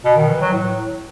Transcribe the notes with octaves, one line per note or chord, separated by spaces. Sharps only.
B2
D#3
E3
F#3
A2